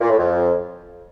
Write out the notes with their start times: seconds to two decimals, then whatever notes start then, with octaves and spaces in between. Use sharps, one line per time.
0.01 A#2
0.09 A2
0.18 F2